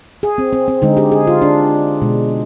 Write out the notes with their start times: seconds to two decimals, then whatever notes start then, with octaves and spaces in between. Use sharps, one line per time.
0.23 G#4
0.38 C4
0.53 C4
0.68 C4
0.82 D3 G#3 D#4
0.97 G4
1.12 G#4
1.27 F4
1.42 D4
2.02 B2 G#3